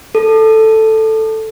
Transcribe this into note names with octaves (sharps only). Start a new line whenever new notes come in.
A4